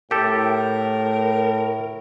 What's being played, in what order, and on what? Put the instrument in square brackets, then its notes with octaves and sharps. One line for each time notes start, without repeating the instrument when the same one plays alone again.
[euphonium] A2 [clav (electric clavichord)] G4 A4 [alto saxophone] A#4